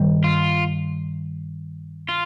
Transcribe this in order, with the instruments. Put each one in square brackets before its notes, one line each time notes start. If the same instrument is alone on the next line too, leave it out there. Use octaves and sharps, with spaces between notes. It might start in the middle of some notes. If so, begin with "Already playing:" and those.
Already playing: [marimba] G2 D#3 G3
[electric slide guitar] F4
F4